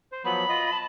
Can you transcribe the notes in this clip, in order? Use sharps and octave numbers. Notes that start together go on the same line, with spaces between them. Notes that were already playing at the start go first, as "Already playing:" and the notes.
C5
F3 F#3 B3 B5
F4 D#5
A5